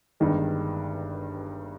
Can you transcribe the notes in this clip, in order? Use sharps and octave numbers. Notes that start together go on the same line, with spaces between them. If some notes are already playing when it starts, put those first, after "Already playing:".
G1 G2 D#3 G#3